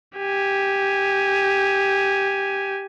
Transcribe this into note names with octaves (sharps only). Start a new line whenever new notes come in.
G4 G#5